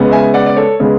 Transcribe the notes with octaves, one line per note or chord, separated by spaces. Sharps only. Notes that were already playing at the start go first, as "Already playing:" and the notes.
Already playing: C#3 G#3 B3
E5 G#5
D5 F#5
D5
A4 C#5
C#3 G#3 B3